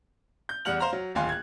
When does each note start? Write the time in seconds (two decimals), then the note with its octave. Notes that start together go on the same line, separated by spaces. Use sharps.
0.49 G6
0.65 E2 G3 F#5 F6 F#7
0.79 C5 F5 A#5 F6
0.93 F#3
1.15 D1 D#2 F4 G#5 C6
1.29 F#6 G#6